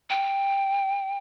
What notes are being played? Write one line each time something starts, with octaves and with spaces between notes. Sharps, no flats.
G5